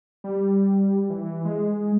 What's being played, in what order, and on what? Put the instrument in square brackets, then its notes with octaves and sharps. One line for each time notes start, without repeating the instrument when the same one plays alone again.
[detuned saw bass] G3
E3
G#3